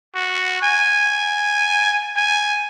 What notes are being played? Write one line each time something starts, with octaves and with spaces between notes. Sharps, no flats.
F#4
G#5
G#5